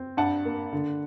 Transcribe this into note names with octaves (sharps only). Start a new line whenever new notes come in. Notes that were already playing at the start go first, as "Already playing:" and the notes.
Already playing: C4
G2 F#5 A5
A#3
D3